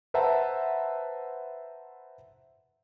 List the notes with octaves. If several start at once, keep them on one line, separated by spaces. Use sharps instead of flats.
B4 C5 E5 F#5 A5 A#5